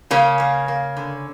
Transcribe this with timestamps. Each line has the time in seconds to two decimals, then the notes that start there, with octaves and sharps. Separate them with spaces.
0.11 C#3 A#3 C#4
0.40 A#3
0.68 A#3
0.97 D3